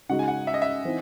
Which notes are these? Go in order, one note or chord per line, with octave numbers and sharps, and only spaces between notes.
C#3 G#3 D#4 F#4 F#5
G#5
F#5
E5
D#5
E5
E3 C4 D#4